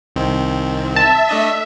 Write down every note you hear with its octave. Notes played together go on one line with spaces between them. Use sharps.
C2 D#3 C4
E5 A5
A3 D4 D#5